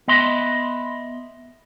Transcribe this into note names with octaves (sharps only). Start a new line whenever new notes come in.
B3 D#5 E5 C6